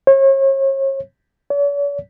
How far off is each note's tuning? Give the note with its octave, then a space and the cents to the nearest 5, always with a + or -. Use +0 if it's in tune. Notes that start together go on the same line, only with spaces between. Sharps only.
C#5 -40
C#5 +45